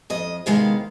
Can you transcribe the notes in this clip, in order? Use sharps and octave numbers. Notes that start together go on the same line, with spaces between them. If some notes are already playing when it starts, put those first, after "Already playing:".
F2 D#5
C3 D#3 G#3 B3 F5